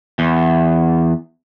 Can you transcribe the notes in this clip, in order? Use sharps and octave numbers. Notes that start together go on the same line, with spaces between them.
E2